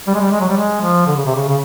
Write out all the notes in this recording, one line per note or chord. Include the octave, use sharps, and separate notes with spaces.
G3
G#3
G3
G#3
F#3
G3
G#3
F3
D3
C#3
C3
C#3
C#3